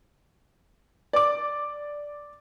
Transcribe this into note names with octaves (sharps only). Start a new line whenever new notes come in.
D5 D6